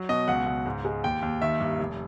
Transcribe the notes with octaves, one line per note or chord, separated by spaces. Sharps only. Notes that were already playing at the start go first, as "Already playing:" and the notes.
Already playing: F#3
B2 D#5
C#2 F#5
C#2
G#2
G#3
D#2 G5
D#2
D#3 E5
G2
F1